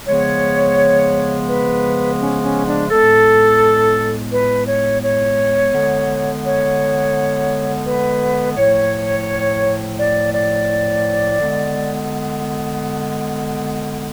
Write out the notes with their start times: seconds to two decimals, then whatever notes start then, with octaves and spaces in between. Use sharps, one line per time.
0.07 C#3 F3 G#3 B3 C#5
1.49 B4
2.20 C#4
2.43 C#4
2.67 D4
2.90 A2 G#3 B3 A4
4.32 B4
4.67 C#5
5.03 C#5
5.74 D3 G#3 B3
6.45 C#5
7.86 B4
8.57 A2 F3 A3 C#5
9.98 D5
10.34 D5
11.40 D3 G#3 B3